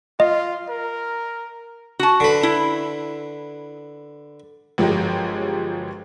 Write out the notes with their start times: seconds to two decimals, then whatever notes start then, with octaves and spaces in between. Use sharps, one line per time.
0.20 F4 D#5
0.69 A#4
1.99 F#4 A5
2.20 D3 B4
2.43 E4
4.78 G1 F3 F#3 G#3 G4 A#4